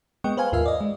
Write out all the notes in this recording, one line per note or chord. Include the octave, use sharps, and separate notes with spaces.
G#3 B3 D#5 G5 C#6
B4 C5 F5 G#5
D#2 G#2 F4 A#4 E5 F5
D5 D#5
G#3